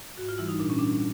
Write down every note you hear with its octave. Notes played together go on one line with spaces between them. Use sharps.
G#2 F#4
F4
E3 G3 E4
D#4
A#2 D4
C#4
G3 D4